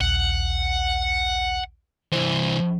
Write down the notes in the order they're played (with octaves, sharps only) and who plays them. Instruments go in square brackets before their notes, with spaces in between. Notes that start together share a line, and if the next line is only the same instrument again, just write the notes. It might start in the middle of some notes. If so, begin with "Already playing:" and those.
[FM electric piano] A#1 D#2 [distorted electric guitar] F#5
[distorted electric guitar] C2 E3 [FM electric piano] C5